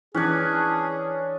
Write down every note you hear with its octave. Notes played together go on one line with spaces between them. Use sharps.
E3 C#4 D4 G#4 F#6 G#6